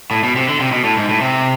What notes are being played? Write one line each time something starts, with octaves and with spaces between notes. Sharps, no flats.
A2
B2
C3
D3
C3
B2
A2
G#2
A2
C3